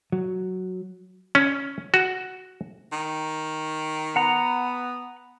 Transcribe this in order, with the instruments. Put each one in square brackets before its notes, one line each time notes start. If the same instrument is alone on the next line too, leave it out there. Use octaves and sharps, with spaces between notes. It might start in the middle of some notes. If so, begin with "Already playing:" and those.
[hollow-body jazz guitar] F#3
[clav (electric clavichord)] C#4
F#4
[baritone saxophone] D#3
[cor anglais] B3 [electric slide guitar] F#5 A#5